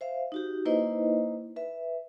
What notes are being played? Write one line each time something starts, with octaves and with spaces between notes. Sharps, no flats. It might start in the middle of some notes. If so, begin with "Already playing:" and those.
C5 E5 F5
D#4 F#4 G4
A#3 D#4 E4 B4 C5 D#5
B4 E5